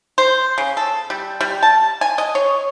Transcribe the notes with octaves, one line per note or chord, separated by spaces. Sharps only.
C5
C#3
A4
G3
G3
A5
G#5
D#5
C#5